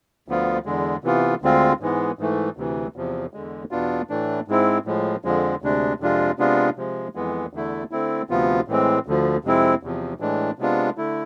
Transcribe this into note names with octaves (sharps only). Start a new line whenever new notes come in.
D2 D3 F3 B3 F4
E2 D3 G#3
C3 E3 B3 F4
D2 D3 G#3 C4 F4
G#2 E3 G#3 B3
G#2 E3 A3
D2 C3 E3
E2 C3 F3
E2 D3 G#3
E2 B2 B3 D4 F4
A2 E3 A3 D4
G#2 G#3 C4 E4
A2 F3 G#3
F2 D3 F3 G#3
D2 C3 G#3 D4
F2 C3 G#3 D4 F4
C3 G#3 B3 D4 F4
C3 F3 G#3
F2 E3 G#3 B3
E2 D3 A3 E4
D3 A3 C4 E4
D2 C3 F3 B3 F4
A2 E3 G#3 C4
D2 D3 F3
F2 C3 G#3 C4 E4
E2 C3 F3
A2 E3 G#3 D4
C3 G#3 B3 D4 F4
D3 A3 E4